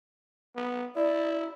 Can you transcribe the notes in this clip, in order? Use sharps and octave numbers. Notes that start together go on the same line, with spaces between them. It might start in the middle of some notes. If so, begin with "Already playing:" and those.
B3
E4 D5